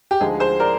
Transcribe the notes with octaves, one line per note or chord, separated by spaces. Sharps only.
G4
D2 D3 F3 G#3 D#4 G#4
G#4 C5
A#4 D5